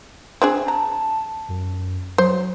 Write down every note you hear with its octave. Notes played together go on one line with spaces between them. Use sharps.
C4 D4 G#4
A5 A#5
F#2
F#3 C5